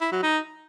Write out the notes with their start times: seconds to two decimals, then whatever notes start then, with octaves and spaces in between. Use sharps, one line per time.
0.01 E4
0.12 F#3
0.23 D#4